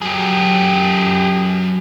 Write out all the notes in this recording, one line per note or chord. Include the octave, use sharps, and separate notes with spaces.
F#2 G4 G#4